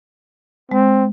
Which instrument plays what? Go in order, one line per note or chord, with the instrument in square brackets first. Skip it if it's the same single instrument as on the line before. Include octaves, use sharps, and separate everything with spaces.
[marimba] G#3 [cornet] C4